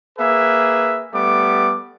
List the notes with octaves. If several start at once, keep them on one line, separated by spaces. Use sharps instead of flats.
A#3 G#4 B4 E5
G3 A3 B3 D6